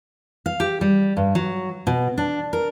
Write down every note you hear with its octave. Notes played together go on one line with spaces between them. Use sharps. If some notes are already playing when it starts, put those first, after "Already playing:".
F5
G4
G3
G2
F#3
B2
D4
A#4